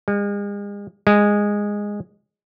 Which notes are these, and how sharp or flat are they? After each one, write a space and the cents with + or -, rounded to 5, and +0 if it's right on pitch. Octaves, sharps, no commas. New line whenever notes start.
G#3 -40
G#3 -10